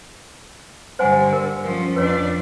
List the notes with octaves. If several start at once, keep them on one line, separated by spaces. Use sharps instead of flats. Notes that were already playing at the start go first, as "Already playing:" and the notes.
G2 D3 C5 F#5 G#5
A#4
F3 C#4
F2 D4 B4 C#5